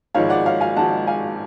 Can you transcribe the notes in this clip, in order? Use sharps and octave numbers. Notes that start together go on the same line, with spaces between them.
G#1 G#2 F3 G#3 C#5 F5
D5 F#5
C#5 F5
F5 G#5
G#1 G#2 F3 G#3 F#5 A5
F5 G#5